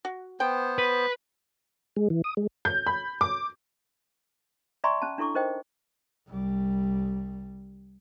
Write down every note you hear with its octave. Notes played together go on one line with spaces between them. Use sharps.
F#4
B3 C5 G5
B4
G#3
E3
D#6
G#3
G6
B5
D6
D5 E5 G#5 A#5 C6 C#6
C#4 A5
D4 E4 A4 C#6 D6
D#4 A#4 C5 D#5 G5
C2 G3